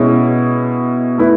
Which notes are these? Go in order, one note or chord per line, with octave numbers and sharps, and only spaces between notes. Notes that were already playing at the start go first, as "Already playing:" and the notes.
Already playing: B2 G#3 C#4 E4
A3 E4 B4